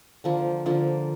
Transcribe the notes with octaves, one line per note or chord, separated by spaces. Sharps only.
D3 F3 A#3
D3 F3 A#3